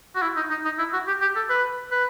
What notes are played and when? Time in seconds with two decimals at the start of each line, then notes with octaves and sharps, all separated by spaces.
0.16 F#4
0.22 E4
0.36 D#4
0.50 D#4
0.65 D#4
0.79 E4
0.93 F#4
1.07 G4
1.21 G4
1.36 A4
1.50 B4
1.91 B4